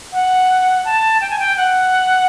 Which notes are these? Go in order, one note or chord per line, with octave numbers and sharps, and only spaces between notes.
F#5
A5
G5
G#5
G5
F#5